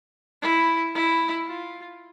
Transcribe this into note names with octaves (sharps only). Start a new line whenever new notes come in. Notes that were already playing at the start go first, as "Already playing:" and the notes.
E4
E4
F4